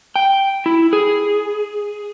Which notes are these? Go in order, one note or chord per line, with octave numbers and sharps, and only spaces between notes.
G5
E4
G#4